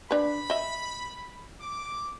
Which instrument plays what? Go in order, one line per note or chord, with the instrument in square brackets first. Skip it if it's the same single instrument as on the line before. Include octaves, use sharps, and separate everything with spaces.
[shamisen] D4 B4 [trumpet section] B5
[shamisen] D#5 E5
[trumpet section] D6